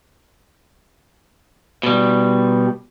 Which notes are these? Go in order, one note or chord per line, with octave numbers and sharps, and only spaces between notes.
B2 G3